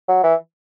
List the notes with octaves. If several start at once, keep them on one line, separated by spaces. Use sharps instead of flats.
F#3
E3